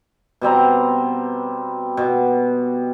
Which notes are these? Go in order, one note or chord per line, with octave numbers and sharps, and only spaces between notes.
B2 G3 C4 A#5
B2